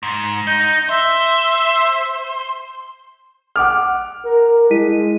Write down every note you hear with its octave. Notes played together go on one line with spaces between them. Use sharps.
G#2
D#4 G6
C5 E5
F#5 D6 F6
A#4
G#3 E4 B6 D#7